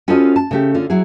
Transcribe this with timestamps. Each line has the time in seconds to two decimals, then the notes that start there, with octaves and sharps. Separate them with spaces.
0.08 C#4 F4 F#4 A4 C5 D#5
0.36 A5
0.51 C#3 A3 G4
0.74 D3 C#4 F4
0.90 F#3 E4 G#4